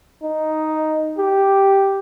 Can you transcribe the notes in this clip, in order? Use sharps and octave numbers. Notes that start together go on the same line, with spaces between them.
D#4
G4